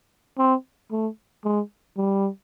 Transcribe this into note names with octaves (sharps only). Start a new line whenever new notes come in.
C4
A3
G#3
G3